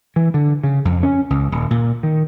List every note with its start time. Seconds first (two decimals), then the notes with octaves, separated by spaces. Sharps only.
0.16 E3
0.34 D3
0.64 C#3
0.85 F2
1.03 C#4
1.30 C#2
1.52 D#1
1.71 A#2
2.03 D#3